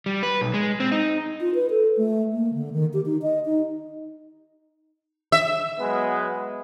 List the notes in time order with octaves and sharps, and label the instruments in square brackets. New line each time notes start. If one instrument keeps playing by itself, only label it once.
[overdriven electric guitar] G3
B4
B1
G#3
C4
D#4
[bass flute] F4
B4
A4
A3
A#3
D3
D#3
G4
D#4
D#5
D#4
[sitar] E5
[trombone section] F#3 G#3 B3